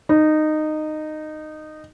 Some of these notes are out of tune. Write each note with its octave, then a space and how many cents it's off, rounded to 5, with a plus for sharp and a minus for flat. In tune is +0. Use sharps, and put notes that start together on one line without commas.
D#4 -15